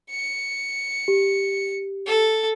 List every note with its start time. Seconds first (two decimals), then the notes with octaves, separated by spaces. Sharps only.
0.11 C#7
1.08 G4
2.06 A4